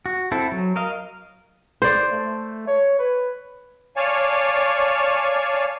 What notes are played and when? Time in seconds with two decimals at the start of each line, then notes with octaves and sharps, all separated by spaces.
0.06 F#4
0.32 C4 E4 A4
0.52 F#3
0.76 A#4 D#5 F5
1.82 C5 D5
2.11 A3
2.67 C#5
2.99 B4
3.96 C#5 D5 F5 G#5 A5 C#6